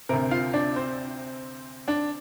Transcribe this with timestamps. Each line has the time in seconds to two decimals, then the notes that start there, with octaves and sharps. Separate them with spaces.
0.09 D2 C3 A#4
0.31 F4 F5
0.54 D4 D5
0.76 C4 C5
1.88 D4 D5